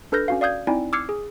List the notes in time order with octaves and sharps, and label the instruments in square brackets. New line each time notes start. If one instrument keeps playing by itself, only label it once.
[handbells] D4 A4 B4 F6 G6 A#6
C#4 F#4 F5
D5 F5 D#6 G6 G#6
C4 D#4 E4 D5 G5 G#5
D6 E6 F6 G#6 C7 C#7
G#4